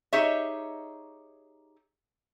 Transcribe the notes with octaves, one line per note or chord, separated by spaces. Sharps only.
D#4 G4 G#4 C#5 D#5 E5